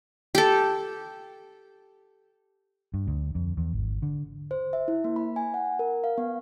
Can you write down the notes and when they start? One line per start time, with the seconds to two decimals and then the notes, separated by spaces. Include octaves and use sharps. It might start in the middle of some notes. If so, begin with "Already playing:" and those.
0.35 G4 A4
2.94 G2
3.07 D2
3.35 F2
3.57 E2
3.73 G#1
4.02 D3
4.51 C5
4.73 E5
4.88 E4
5.04 A#3
5.16 B5
5.36 G#5
5.54 F#5
5.79 A#4
6.04 F5
6.18 B3